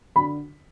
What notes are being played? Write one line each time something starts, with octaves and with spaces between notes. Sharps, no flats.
D3 B5